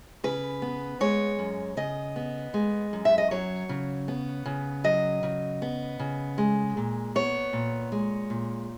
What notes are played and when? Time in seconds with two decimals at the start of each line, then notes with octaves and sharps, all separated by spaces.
0.24 C#3 B4
0.62 B3
1.00 G#3 C#5
1.39 F#2
1.77 C#3 D#5
2.16 B3
2.54 G#3
2.93 F#2
3.05 E5
3.18 D#5
3.31 F#3 C#5
3.69 C#3
4.08 B3
4.46 C#3
4.84 F#3 D#5
5.23 C#3
5.62 B3
5.99 C#3
6.38 G#3
6.77 A#2
7.15 B3 C#5
7.53 A#2
7.92 G#3
8.30 A#2